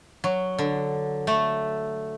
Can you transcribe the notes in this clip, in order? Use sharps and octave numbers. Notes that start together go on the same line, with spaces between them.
F#3
D3
A3